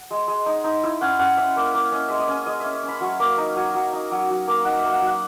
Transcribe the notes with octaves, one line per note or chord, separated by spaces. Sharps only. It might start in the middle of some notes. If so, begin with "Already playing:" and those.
Already playing: F#5
G#3
G#3
D#4
D#4
E4 E5
C#4 F#5
C#4 F#5
C#4 E5
A#3
A#3
C#4 D#5
G#3 E5
D#5
C#4
G#3 D#5
C#4 E5
E5
C#4
B5
F#3 C#6
A#3 B5
D#4 A#5
F#3 G#5
F#3
D#4
F#3
F#3
A#3
D#4 F#5
E5
A#3
F#5
F#3
F#5